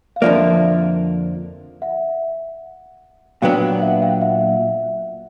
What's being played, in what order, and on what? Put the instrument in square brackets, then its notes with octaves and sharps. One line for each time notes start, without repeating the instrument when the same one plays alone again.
[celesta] F5
[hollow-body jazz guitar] F2 D3 F3 A#3 [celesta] D5 E5
[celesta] E5 F#5
[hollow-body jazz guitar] A#2 F#3 B3 D4 [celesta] F5 G5
[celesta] F5 G5
E5 F#5
F5 G5
E5 F#5